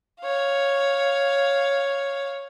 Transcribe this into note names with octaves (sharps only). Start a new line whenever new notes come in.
C#5 F5